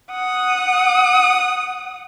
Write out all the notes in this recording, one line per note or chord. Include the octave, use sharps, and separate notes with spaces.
F#5 D#6